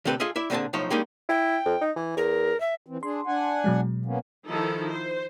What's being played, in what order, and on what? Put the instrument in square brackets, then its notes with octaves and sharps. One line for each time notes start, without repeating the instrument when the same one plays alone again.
[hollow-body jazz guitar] D2 C3 C4 A4 B4
F4 G#4 A4 D#5 E5
E4 D5 E5
A#2 D3 C4 G#4 A5
B1 A2 F3 D#4 C#5 A5
G3 G#3 A#3 C#4 D#4
[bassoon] E4 [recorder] G5
[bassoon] F2
D#4
E3
[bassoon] E2 [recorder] A#4
[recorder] E5
[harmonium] E3 C4
[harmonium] D4 G#4 [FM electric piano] C6
[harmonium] D4 F#5 G#5
[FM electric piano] B2 F#3 G#3
[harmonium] A#3 B3 C#4
[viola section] D#3 F3 D#4 E4 A4
C5